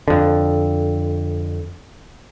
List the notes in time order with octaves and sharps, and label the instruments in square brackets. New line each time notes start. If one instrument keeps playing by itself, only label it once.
[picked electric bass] F2 D3